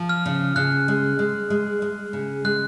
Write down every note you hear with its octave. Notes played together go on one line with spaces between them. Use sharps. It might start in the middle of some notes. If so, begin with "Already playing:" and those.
Already playing: F3
F6
C#3
C#3 F#6
G#3
G#3
G#3
G#3
C#3
G#3 F#6